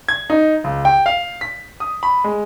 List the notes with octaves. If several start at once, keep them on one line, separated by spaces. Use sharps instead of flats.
G#6
D#4
C#2
G5
F5
B6
D#6
B5
G#3